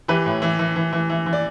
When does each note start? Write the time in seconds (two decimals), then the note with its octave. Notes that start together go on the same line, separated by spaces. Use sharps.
0.08 E3 G4 B4
0.26 A2
0.42 E3
0.59 E3
0.76 E3
0.93 E3
1.10 E3
1.26 E3
1.33 D5